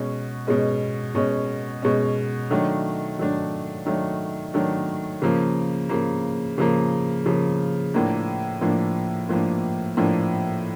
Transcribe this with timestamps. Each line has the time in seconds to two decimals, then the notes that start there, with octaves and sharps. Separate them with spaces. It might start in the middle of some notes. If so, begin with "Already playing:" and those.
Already playing: B2 G#3 C#4
0.47 B2 G#3 C#4
1.15 B2 G#3 C#4
1.82 B2 G#3 C#4
2.51 D#3 F#3 A3 D4
3.18 D#3 F#3 A3 D4
3.86 D#3 F#3 A3 D4
4.54 D#3 F#3 A3 D4
5.22 C#3 F3 A#3
5.89 C#3 F3 A#3
6.58 C#3 F3 A#3
7.26 C#3 F3 A#3
7.94 A2 F3 A#3 D4
8.61 A2 F3 A#3 D4
9.29 A2 F3 A#3 D4
9.97 A2 F3 A#3 D4